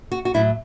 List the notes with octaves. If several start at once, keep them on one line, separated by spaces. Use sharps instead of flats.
F#4
F#4
A2 F#3 A3 E4